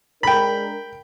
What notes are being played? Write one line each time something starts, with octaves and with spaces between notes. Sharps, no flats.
G#3 D4 A#4 G5 B5